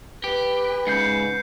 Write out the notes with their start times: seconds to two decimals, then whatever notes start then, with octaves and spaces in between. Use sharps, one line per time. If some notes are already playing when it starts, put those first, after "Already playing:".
0.24 G4 B4
0.87 G#2 C#3 G6 C7 C#7